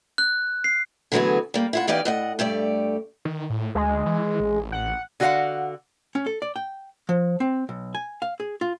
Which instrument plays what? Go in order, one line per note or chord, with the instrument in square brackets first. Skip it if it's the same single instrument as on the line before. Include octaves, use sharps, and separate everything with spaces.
[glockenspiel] F#6
C7
[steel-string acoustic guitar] D3 E3 F#3 A3 B3 G#4
G3 A#3
E4 F4 F#5
E2 E3 D#4 G4 D5 F5
A2 D#5 F#5
G2 A3 G4 D5
[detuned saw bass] D#3
A2
[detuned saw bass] D2 [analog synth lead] G#3
[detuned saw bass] E3
A1
[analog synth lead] F#5
[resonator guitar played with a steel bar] D3 F#4 G#4 C#5 F5 F#5
[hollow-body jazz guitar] C#4
A4
D5
G5
F3
C4
B1
G#5
F5
G#4
F4